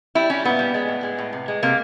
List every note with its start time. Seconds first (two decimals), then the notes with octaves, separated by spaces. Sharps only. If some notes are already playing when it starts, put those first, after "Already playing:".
0.15 G3 E4
0.30 G3 C#4
0.45 A#2 B3
0.59 G3
0.74 G#3
0.89 A2
1.03 G#3
1.18 A2
1.33 C3
1.48 G#3
1.63 C3 A#3